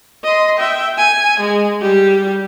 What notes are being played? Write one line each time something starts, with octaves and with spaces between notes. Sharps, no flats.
D#5 C6
E5 G5
G#5
G#3
G3 G4